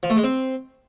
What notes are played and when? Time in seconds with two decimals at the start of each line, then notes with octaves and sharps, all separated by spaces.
0.03 F3
0.10 A3
0.17 G#3
0.24 C4